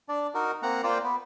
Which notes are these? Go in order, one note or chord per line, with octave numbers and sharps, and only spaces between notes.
D4 D5
D#4 F#4 A#4
A#3 C4 F#5 A#5
A#3 F4 C5 D5 G5
B3